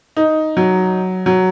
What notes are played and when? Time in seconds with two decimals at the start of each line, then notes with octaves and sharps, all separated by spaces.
0.17 D#4
0.57 F#3
1.26 F#3